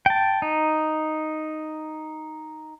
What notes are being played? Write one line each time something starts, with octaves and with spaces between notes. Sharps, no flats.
G5 A5
D#4